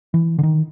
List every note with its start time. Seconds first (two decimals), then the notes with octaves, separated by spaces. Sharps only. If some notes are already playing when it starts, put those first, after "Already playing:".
0.14 E3
0.39 D3
0.43 D#3